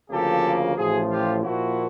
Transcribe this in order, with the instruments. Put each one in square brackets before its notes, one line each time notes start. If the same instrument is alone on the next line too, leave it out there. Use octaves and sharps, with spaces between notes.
[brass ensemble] D2 C#3 F3 A#3 G4 A4
A1 A2 F3 F#4 G#4
F4 G4
A#2 F3 A#3 E4 F#4